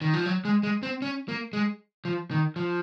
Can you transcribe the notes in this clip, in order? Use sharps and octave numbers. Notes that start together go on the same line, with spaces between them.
D#3
F3
F#3
G#3
G#3
C4
C#4
A#3
G#3
F3
D#3
F3